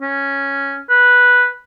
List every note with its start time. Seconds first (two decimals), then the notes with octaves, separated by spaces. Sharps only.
0.01 C#4
0.89 B4